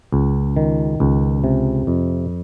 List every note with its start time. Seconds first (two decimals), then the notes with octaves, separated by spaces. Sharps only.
0.12 C#2
0.56 D#3
1.00 C#2
1.44 C3
1.87 F2